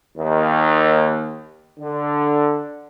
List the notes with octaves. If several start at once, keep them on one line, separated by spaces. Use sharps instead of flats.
D#2
D3